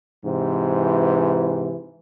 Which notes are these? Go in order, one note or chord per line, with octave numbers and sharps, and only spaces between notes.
G#2 C3 E3